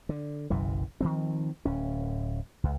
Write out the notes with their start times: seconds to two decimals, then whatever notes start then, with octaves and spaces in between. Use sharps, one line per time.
0.09 D3
0.50 F#1 B1 F#2 E3
1.00 D#3 F3 C4
1.65 D1 C#4
2.64 C#2